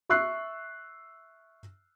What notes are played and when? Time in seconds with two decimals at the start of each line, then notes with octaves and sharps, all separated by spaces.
0.09 E5 C#6 E6 F#6 C7